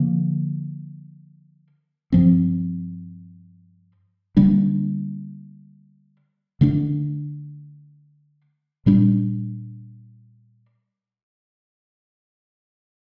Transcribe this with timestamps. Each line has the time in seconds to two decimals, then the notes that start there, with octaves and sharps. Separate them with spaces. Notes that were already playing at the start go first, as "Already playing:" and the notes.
Already playing: D3 F3 A#3
2.12 G2 F3 C4
4.37 D3 G3 A#3 D4
6.61 D3 A3 D4
8.86 A#2 G3 D4